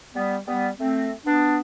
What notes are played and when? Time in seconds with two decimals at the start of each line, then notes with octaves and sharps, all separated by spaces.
0.15 G3 B3
0.46 G3 B3
0.78 A3 C4
1.26 B3 D4